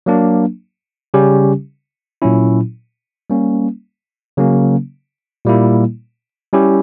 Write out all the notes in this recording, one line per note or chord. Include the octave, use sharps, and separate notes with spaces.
F#3 A#3 D4
C#3 G3 C#4 G4
A#2 F#3 C#4 E4
G3 A#3 C#4
C#3 F#3 A#3 C#4
A#2 G3 A#3 E4
G3 C#4 E4 G4